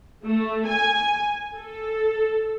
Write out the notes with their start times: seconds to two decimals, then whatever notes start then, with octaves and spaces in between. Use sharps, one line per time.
0.25 A3
0.68 G#5
1.56 A4